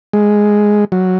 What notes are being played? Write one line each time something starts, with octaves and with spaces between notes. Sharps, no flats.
G#3
F#3